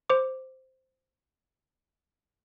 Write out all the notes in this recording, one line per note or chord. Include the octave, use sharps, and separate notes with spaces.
C5 D6